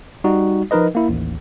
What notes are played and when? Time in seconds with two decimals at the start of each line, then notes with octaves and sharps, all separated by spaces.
0.24 G3 D#4 F#4
0.71 F3 D#4 A#4 B4 D#5
0.95 A#3 E4
1.09 A1 D#2